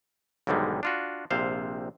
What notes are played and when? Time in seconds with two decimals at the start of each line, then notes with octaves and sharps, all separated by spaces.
0.47 B1 G#2 D3 D#3 G3 G#3
0.83 D4 F4 F#4
1.31 A#1 C3 C5 F5